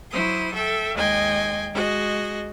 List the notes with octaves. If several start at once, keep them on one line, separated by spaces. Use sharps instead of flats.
F#3 E4 C5 D#6
A4 E5 G5
D#2 G#3 D#5 G5 G#5 C6
G#3 F#4 G#4 D#5